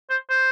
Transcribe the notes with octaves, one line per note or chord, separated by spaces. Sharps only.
C5
C5